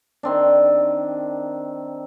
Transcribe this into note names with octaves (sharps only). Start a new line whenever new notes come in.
D#3 C4 D4